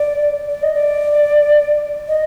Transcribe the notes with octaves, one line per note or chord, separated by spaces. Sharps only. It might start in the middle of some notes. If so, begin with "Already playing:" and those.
Already playing: D5
D5
D#5
D5
D#5